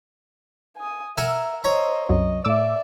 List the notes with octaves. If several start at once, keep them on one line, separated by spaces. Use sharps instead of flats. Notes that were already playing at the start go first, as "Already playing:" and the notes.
G#5 D#6
A#4 E5 F#5 G#5 E6
C5 C#5 D#5 A#5
C2 F#2 D#5
A2 D5 E5 D6 E6